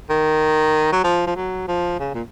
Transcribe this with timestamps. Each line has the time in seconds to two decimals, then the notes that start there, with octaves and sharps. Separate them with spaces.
0.10 D#3
0.93 F#3
1.04 F3
1.27 F3
1.37 F#3
1.68 F3
2.00 C#3
2.14 A#2